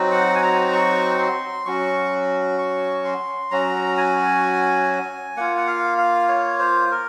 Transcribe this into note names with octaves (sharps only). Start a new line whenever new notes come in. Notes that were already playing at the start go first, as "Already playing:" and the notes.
Already playing: F#3 C4 D#4 F#4
F#5
G#5
A#5
C#6
C6
F#3 C#4 F#4 C#6
C#6
C6
F#3 C#4 F#4 A#5
G#5
A#3 F4 F#5
F#5
F5
F5
C#5
C5
A#4